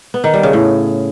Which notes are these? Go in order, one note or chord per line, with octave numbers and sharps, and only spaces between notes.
B3
D#3
G3
C#3
A2